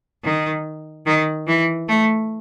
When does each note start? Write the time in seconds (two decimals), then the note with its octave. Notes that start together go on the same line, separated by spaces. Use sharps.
0.24 D#3
1.06 D#3
1.47 E3
1.88 A3